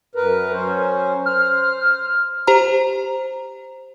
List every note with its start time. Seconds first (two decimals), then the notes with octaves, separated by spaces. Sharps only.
0.15 F#2 A#4 B4
0.52 F#3 C#4 C5
1.26 C5 F6
2.47 G4 C5 A#5